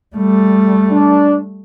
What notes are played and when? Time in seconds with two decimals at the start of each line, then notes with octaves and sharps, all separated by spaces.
0.16 G3 A3
0.91 D4